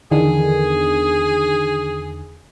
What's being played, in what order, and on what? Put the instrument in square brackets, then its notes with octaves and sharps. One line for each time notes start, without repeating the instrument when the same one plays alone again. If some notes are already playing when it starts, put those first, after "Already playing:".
[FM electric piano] E2 D3 D#3 [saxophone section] G#4